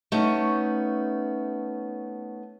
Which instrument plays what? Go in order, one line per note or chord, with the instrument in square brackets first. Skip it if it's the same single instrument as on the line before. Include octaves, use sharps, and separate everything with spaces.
[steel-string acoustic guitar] A3 B3 C#4 D#4